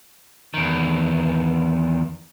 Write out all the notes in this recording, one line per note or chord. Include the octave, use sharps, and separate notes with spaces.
E2 D#3